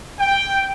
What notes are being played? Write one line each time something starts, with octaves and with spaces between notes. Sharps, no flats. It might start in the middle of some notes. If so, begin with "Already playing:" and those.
G5